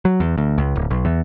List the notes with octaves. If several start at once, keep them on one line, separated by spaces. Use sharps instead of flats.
F#3
E2
D2
C#2
D1
B1
E2